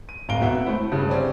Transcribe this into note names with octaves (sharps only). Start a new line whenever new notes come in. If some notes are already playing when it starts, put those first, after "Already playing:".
D#7
D1 F5 A#5 D7 G7
G#1 B2 E5 F#5
A3 C4 E4
G2 C#3
C4 C#4 D5